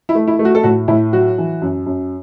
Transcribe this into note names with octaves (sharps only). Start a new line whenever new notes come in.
E4
A3
E4
A3
F#4
A4
A2 F#4
A2 E4
F#3 F#4
E3
F#2
F#2